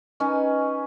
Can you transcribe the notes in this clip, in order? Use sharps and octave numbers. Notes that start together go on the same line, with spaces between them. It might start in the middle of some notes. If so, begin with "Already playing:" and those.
C#4 D#4 B4 G#5